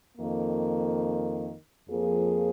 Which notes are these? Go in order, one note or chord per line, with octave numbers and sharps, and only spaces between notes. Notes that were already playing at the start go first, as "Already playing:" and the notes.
F2 D#3 A#3
F2 F3 A#3 G#4